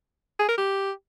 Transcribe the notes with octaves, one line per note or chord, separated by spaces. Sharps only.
G#4
A#4
G4